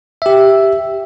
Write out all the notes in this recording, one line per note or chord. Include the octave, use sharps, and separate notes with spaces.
G4 E5